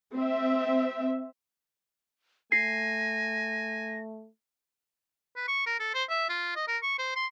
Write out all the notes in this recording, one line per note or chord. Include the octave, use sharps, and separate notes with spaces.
C4 E5
A3 G#5 A#6 C7
B4
C#6
A#4
A4
C5
E5
F4
D#5
A#4
C#6
C5
C6